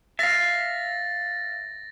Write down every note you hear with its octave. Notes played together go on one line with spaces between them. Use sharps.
E5 F5 A6 A#6